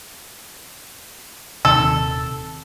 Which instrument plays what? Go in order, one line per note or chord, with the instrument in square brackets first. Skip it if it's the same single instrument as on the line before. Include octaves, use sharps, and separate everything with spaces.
[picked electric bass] D#1 C3 D#3 [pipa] A4